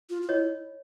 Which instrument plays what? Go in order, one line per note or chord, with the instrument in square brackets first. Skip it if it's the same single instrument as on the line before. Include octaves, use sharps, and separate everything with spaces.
[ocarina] F4
F4
[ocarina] E4 [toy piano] C#5 D#5